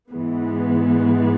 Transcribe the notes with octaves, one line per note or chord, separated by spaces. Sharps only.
G#2 E3 G#3 B3